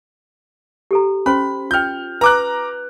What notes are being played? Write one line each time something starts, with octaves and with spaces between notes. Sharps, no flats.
G4 A4 A#5
C#4 C5 B5 C6
F4 G5 F6 G6
B4 A#5 D6 F#6